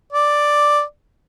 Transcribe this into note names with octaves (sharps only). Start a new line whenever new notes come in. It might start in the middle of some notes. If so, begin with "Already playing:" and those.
D5